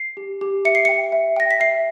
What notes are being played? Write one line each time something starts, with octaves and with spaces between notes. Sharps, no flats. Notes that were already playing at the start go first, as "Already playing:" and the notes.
Already playing: C7
G4
G4
E5 C#7
C7
G5 C#7
E5
G5 A#6
B6
E5 C7